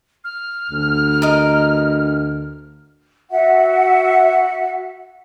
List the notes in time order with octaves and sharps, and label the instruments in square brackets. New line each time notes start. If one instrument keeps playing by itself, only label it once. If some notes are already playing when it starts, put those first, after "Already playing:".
[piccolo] F6
[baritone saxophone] D2
[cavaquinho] A#4 D#5
[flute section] F#4 E5 F#5